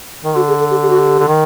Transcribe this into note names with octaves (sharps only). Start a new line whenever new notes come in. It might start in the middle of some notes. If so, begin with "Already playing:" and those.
D#3
D3 F#4
G#4
A4
G4
G4
F#4
G4
D3
D#3